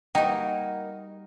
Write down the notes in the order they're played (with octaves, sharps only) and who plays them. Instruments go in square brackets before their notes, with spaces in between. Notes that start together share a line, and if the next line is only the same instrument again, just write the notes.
[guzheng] G3 F#4 [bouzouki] A#3 D#5 [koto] D#4 [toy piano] G5